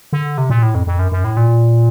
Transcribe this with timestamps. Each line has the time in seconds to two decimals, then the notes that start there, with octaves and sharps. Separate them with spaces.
0.13 D3
0.38 C3
0.50 A#2
0.63 A2
0.75 F2
0.87 F2
0.99 F#2
1.12 F#2
1.24 A2
1.37 A#2